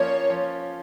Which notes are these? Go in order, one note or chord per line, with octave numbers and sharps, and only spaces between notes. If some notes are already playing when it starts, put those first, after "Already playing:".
Already playing: F3 A#3 C#4 F4 C#5
F3 C#4 F4